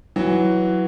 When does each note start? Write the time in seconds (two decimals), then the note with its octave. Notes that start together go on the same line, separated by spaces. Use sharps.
0.16 E3 F#3